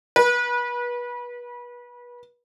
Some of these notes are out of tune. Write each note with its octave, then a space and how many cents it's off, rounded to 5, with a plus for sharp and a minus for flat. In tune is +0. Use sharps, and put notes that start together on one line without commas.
B4 -30